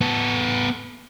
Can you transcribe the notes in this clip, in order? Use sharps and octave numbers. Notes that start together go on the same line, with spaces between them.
B3 A4